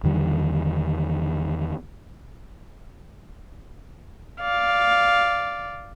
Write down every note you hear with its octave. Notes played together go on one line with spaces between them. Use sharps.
E2 D3 D#3 G3
D5 F5